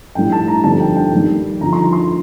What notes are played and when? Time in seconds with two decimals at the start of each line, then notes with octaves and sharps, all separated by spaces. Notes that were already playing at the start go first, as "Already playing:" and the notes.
0.15 A#1 A2 G3 G5
0.32 A5
0.48 A#5
0.64 G1 F2 D3 G3 A5
0.80 G5
0.97 G5
1.12 D#2 D#3 G3
1.60 G1 F2 D3 F3 A#5
1.73 C6
1.76 A#5
1.93 C6